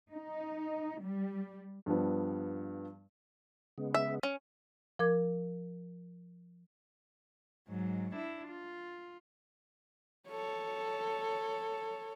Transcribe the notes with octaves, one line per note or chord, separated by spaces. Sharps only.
D#4
G3
G2 F3 G3 B3
C#3 G#3 B3
E5
C#4
F3 A#4 D6 G#6
G#2 F#3
D4 E4
F4
A4 C#5